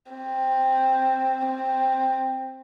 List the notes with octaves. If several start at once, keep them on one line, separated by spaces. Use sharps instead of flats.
C4
C4